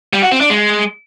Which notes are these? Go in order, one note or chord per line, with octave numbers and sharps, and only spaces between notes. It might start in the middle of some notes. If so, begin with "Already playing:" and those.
G3
F#4
C4
D4
G#3